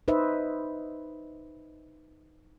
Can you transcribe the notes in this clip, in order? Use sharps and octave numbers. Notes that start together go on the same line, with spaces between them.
D#4 B4 C5 D#5 E5